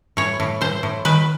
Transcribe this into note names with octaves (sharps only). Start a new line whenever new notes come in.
A2 C#5
A2
A2 C5
A2
D#3 B4